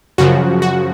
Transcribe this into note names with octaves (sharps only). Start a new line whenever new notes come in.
F#2 C#3 F3 F#4
F#4